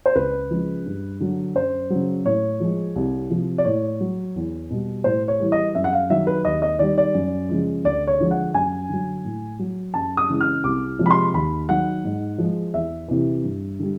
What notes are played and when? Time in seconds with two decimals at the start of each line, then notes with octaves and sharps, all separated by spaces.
0.06 C5
0.15 C#2 B4
0.51 C#3 F3 G#3
0.86 G2
1.20 D3 F#3
1.55 F#2 C5
1.90 C#3 F#3
2.25 A2 C#5
2.60 F3 G#3
2.96 C2
3.30 C3 F3
3.58 D5
3.65 A2 C#5
4.01 F#3
4.36 E2
4.70 B2 G3
5.04 A2 C5
5.28 C#5
5.40 E3 G3
5.52 D#5
5.75 F#2 E5
5.84 F#5
5.93 F5
6.10 D#3 F#3 E5
6.27 B4
6.45 D#2 D#5
6.62 D#5
6.79 D#3 G3 D5
6.98 D5
7.14 F#2
7.49 C#3 F3 G#3
7.84 D2 D5
8.07 C#5
8.20 D3 F3 G#3
8.31 F#5
8.54 F#2 G#5
8.89 D3 F#3
9.25 A2
9.59 F#3
9.94 F#2 A5
10.17 D#6
10.30 C#3 E3 G#3
10.41 F6
10.64 C2 D6
10.99 C3 F3 G#3
11.06 B5
11.11 C6
11.34 D#2 B5
11.69 D#3 F#3 F#5
12.05 G#2
12.38 F3 G#3
12.74 E2 E5
13.08 C3 E3
13.44 G2
13.79 D3 G3